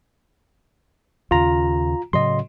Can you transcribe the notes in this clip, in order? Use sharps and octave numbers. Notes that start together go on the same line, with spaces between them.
D#2 C#3 F4 A#5
A2 C#3 F#3 D#5 C6